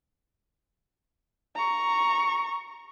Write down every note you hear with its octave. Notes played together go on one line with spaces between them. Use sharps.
A#5 C#6